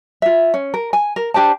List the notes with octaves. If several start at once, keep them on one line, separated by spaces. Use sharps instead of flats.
F4 E5
C#4
A#4
G#5
A#4
D4 G4 C5 A5